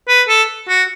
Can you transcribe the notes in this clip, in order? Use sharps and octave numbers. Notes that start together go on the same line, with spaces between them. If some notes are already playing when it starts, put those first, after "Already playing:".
B4
A4
F#4